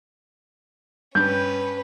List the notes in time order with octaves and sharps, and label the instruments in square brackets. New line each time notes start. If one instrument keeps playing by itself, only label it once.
[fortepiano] G2 [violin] C#4 B4 [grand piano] G6